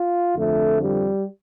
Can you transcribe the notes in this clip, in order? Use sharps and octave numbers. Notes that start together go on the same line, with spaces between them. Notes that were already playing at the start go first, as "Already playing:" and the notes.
Already playing: F4
F2 D3 F3 A3
G3